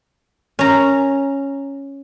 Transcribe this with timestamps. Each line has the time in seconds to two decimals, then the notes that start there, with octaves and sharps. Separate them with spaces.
0.59 C#4 A#5